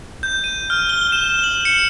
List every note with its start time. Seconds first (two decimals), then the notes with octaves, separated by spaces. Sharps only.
0.23 G6
0.44 D#7
0.70 F6
0.89 G7
1.12 E7
1.44 F#7
1.65 C#7